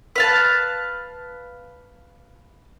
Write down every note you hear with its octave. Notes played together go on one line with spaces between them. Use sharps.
B4 F5 A5